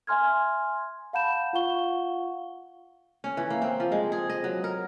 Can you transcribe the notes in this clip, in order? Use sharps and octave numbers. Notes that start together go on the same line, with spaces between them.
E5 G#5 C6 F6 G#6
F5 F#5 A5 B5 G6 E7
F4 F5 F#5 C#6 G7
C#4
E3
A#3
C4
F3
G#3
G#4
D#5
F#3
A#4